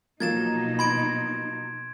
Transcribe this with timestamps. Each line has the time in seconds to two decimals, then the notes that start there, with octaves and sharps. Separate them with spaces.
0.20 B2 F3 F#3 A#3 D#4 G#6 A6 E7
0.79 B5 C6 G#6 D7